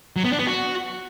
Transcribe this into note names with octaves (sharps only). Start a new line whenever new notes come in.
F#3
B3
D4
B3
F#4